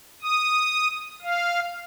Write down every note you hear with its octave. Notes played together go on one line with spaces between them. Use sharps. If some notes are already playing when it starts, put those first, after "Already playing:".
D#6
F5